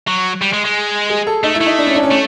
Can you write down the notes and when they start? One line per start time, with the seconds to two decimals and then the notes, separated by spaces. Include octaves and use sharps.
0.08 F#3
0.41 G3
0.53 G#3
0.64 G#3
1.10 G#4
1.27 A4
1.44 A3 D#4
1.55 E4
1.61 A3
1.67 D#4
1.78 D4
1.87 C#4
1.95 D4
2.03 C#4
2.11 A3